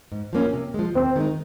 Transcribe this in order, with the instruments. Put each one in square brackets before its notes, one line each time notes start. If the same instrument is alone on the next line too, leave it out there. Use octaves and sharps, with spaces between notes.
[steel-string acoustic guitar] G#2
F3 A#3 C#4
C3
F3 G#3
[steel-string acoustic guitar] D#2 [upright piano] C4
[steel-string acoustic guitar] D#3 G#3 D#4